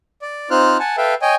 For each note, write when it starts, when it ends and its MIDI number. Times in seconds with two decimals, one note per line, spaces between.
0.22 0.50 74
0.50 0.78 60
0.50 0.78 63
0.50 0.78 65
0.50 0.78 72
0.50 0.78 89
0.50 0.78 90
0.79 0.96 78
0.79 0.96 80
0.79 0.96 81
0.97 1.14 69
0.97 1.14 71
0.97 1.14 76
0.97 1.14 77
0.97 1.14 79
1.22 1.35 73
1.22 1.35 75
1.22 1.35 79
1.22 1.35 80